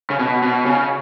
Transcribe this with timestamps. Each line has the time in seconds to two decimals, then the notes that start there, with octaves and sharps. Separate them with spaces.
0.10 C#3
0.19 B2
0.42 B2
0.66 C#3